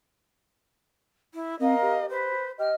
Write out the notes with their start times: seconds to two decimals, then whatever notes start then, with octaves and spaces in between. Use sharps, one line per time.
1.34 E4
1.60 C4 A#4 D#5 F5
1.82 G4
2.10 B4 C5
2.59 G4 D#5 F6